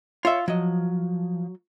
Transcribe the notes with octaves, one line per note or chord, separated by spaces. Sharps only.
F4 C#5 E5
F3 F#3 D#5